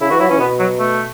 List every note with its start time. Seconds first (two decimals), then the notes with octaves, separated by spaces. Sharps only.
0.01 C#3 E4
0.10 E3 F#4
0.20 F#3 E4
0.29 E3 C#4
0.39 B2 B3
0.59 F#3
0.79 A3